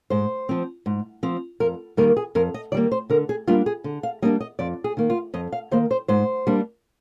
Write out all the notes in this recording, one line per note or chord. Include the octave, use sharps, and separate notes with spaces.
G#2 C5
F3 C4
G#2
F3 C4
F2 A#4
D#3 G3 A#3 A#4
G#4
F2 A#4
D#5
D#3 G3 A#3 D5
C5
D3 A#4
G#4
G3 A#3 D4 F4
G#4
D3
F5
G3 A#3 D4 D#5
D#5
F2 D5
G#4
D#3 A#3
F4
F2 D#5
F5
D#3 A#3 C5
C5
G#2 C5
G3 A#3 D4